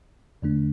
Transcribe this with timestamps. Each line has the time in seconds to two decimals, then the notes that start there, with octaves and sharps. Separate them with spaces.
0.42 E2 D3 A3 D4